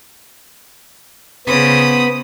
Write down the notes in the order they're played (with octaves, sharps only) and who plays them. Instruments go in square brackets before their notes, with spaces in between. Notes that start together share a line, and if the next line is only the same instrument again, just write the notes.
[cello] C#3 C5 [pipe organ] B3 B5 [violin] D#6